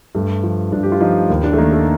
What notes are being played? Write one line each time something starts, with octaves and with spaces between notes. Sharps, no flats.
G2 A3
F3
G2 D4
G4
F4
F3 D#4
D#2
D4
A3
D#3 A#3
A4